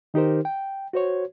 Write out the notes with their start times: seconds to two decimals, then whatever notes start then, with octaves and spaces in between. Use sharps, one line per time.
0.14 D#3 D#4 G4 A#4 C5
0.45 G5
0.93 F#4 C5 C#5